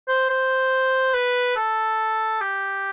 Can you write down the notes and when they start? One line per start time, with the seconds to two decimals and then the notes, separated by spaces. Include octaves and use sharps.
0.08 C5
0.30 C5
1.14 B4
1.56 A4
2.41 G4